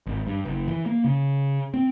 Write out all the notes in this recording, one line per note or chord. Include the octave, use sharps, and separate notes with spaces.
G#1
G2
F#1
E3
A#3
C#3
C4